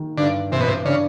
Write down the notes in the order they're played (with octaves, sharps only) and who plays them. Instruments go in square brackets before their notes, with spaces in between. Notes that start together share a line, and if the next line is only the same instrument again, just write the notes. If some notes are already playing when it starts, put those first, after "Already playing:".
Already playing: [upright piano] D#3
[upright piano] G2 [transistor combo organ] D3
[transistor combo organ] C3 [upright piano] E3
[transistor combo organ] B2
C3
[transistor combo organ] C#3 [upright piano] D4